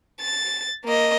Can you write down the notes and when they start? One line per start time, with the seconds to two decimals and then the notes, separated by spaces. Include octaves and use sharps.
0.21 A6
0.85 A#3 D#5